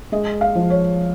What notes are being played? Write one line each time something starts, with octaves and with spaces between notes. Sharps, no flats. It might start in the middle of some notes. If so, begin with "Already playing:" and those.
G#3 D#5
F5
F3
C#5